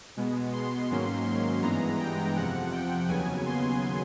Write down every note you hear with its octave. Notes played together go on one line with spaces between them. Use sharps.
B2 G#3 B3
C6
G#2 D#3 F#3 A#3 C#4
C6
G2 E3 G#3 B3 A#5
G5
F2 C3 F3 F#5
G5
D#2 C#3 F#3 B3 G#5
C6